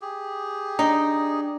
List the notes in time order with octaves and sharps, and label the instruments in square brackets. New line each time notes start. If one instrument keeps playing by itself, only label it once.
[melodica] G4 G#4
[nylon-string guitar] D4 [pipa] D#4